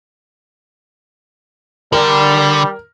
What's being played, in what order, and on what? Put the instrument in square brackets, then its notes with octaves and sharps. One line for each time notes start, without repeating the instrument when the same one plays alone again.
[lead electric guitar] D3 [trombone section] G3 [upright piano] A#4